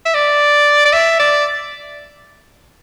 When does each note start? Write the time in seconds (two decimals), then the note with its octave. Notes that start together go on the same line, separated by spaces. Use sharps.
0.06 E5
0.15 D5
0.86 D5
0.93 E5
1.19 D5